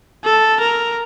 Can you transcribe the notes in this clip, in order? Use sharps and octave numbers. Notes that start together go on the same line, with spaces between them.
A4
A#4